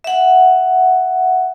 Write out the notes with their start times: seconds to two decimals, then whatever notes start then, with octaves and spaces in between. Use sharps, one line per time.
0.04 E5 F#5